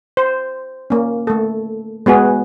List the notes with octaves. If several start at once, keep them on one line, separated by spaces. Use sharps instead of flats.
C5
A#3 C#4
A3 A4
G#3 B3 F#4 G#4